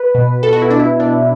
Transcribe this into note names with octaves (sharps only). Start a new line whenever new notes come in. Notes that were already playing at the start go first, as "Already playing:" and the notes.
Already playing: B4
B2
B2 A4
F#4
E4
B2 D4
E4
B2 D4